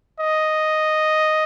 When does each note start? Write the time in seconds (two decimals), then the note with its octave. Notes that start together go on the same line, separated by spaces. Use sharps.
0.20 D#5